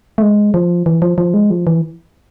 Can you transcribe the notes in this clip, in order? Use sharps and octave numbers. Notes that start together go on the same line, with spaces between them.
A3
G#3
F3
E3
F3
F3
G#3
F3
E3